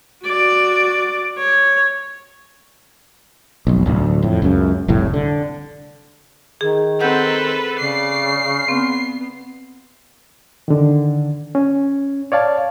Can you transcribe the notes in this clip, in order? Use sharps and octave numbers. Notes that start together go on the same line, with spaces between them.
F#4 D5
C#5
F1 B1
D1 D2
F2 A2
C#2 F#2 C#3
F1 C2 A2
D3
D#3 G#4
C4 A4 B4 F#5 C6 G6
C#3 D5 C7
B3 C4
D3 D#3
C#4
C#5 D5 F5 A5